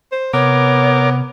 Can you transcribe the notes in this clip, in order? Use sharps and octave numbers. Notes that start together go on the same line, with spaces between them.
C5
C3 B3 A#4 C#5 D6